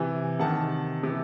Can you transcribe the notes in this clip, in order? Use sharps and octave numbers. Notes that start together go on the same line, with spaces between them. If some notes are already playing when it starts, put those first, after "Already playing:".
Already playing: C3 E3 G#5
C3 D#3 F#5 A5
C3 E3